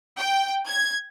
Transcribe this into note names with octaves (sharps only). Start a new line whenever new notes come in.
G5
G#6